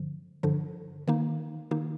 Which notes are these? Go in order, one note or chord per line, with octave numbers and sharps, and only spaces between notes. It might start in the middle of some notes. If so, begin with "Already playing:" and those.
Already playing: G2 D3 F3
G2 D3 F3
D#3 A#3 D#4
D#3 A#3 D#4